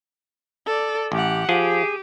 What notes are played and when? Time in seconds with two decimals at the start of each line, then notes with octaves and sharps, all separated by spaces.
0.67 A4 D5
1.12 A1 G4 F#5
1.49 F3 G4 G#4